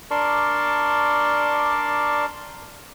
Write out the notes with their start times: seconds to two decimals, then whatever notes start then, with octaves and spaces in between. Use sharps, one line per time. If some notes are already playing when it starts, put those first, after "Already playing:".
0.11 D4 A#4 D5 A5 C6 C#6